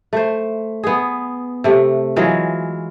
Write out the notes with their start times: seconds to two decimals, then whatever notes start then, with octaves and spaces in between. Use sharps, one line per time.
0.13 A3 C5
0.83 B3 G#4
1.64 C3 A3
2.16 E3 F#3 G#3 F4